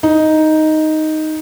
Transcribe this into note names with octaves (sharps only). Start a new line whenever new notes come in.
D#4